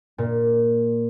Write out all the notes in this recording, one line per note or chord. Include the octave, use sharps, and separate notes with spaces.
A#2